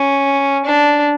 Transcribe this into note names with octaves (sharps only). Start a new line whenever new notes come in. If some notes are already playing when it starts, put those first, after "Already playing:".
Already playing: C#4
D4